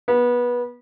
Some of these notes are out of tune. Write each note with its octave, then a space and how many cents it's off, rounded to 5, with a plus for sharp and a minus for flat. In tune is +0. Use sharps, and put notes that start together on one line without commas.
B3 -20